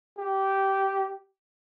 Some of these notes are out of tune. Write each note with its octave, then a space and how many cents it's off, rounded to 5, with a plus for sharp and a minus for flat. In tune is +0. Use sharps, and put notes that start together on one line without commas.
G4 -15